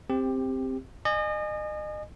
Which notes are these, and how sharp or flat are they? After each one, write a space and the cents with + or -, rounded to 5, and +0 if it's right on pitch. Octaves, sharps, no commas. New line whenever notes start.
C4 +0 G4 +15
D#5 -35 G#5 +0